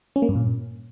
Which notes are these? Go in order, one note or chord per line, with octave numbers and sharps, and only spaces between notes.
C#4
A#3
G2
A#2